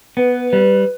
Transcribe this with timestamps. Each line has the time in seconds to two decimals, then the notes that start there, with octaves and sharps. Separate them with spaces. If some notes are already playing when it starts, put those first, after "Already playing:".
0.17 B3 B4
0.52 G3 B4